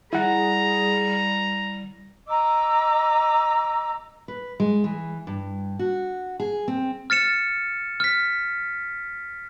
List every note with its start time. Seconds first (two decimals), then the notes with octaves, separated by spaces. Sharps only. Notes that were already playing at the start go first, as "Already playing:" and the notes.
0.13 G3 E4 G#4 F#5 A#5
2.28 D#5 A#5 D6 E6
4.28 B4
4.60 G#3
4.84 E3
5.27 G2
5.79 F#4
6.40 G#4
6.68 C4
7.10 F6 A6 C#7 E7
8.00 F6 B6